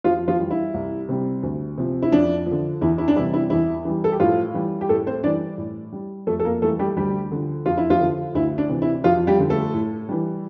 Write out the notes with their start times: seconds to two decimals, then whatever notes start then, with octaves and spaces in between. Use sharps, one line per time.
0.04 F2 F3 F4
0.28 F3 F4
0.40 E3 G3
0.51 E4
0.74 C2
1.09 C3 G3
1.43 D2
1.78 C3 F3
2.02 E4
2.12 F2 D4
2.46 F3
2.51 D3
2.81 E2 E4
2.98 E4
3.08 D4
3.16 C3 E3 G3 E4
3.34 E4
3.50 E2 E4
3.85 E3 G3
4.04 A4
4.12 G4
4.20 A2 F3 F4
4.54 E3 G3
4.81 G4
4.89 A2 A3 A4
5.07 C4 C5
5.24 E3 G3 D4 D5
5.58 A2
5.93 G3
6.27 F2 A3 A4
6.40 A4
6.45 A#3 A#4
6.62 E3 G3 A3 A4
6.79 G3 G4
6.97 D2 G3 G4
7.31 D3 F3
7.66 F2 F4
7.77 E4
7.90 F3 F4
8.01 D3 F3
8.35 D2 E4
8.58 D4
8.69 C3 E3
8.82 E4
9.04 F2 F3 F4
9.27 G3 G4
9.39 D3 F3
9.50 A3 A4
9.74 A2
10.09 E3 G3